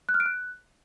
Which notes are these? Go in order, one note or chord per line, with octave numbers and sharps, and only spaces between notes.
F#6
F6
D7
F#6